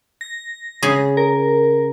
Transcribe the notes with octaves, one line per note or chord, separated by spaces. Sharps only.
A#6
C#3 G#4
A#4